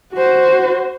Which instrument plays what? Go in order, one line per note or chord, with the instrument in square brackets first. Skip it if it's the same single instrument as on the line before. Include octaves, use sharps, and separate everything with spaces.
[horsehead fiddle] F#4 C5